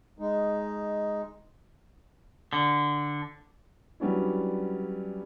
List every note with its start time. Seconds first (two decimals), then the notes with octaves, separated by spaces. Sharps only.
0.19 G#3 D#4
2.53 D3
4.00 F#3 G3 B3 C#4 D4 E4